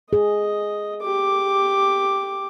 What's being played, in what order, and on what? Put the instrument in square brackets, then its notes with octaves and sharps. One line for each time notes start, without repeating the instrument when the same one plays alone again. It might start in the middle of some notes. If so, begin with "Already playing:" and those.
[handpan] G#4 [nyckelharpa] D#5
[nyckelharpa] G4 D6